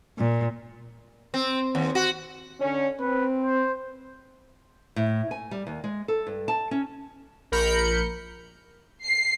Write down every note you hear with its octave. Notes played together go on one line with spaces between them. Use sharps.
A#2
C4
D#2
F#4
D3 C#4
C4 B4
C5
A2
G#5
G3
D#2
G#3
A4
G2
A5
C#4
A#1 A#4 B5 G6 C#7
C7